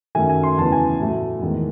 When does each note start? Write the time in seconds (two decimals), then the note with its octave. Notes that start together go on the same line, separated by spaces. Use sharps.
0.15 F#2 D#3 A3 G#5
0.30 G#5
0.43 C6
0.58 E2 C#3 E3 A5
0.72 G#5
1.00 A2 F#3 A3
1.41 E2 D#3 G#3